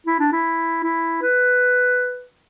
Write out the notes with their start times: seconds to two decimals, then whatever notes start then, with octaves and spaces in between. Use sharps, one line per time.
0.07 E4
0.20 D4
0.32 E4
0.83 E4
1.22 B4